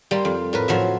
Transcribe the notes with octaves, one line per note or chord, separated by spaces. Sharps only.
G3 A#3 C6
F2
A2 A#4 B4
A2 F3 F#3 E5